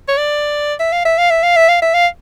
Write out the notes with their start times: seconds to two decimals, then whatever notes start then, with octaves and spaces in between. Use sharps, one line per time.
0.08 C#5
0.18 D5
0.80 E5
0.93 F5
1.05 E5
1.18 F5
1.30 E5
1.43 F5
1.56 E5
1.69 F5
1.82 E5
1.94 F5